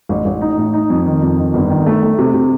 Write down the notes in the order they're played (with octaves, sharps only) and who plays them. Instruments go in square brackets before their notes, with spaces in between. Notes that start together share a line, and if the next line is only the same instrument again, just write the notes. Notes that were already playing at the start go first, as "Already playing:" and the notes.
[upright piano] A1
A1
D#4
A2
D#4
F2
D#3
F2
D#3
G1
D#3
A3
A3
C3
C3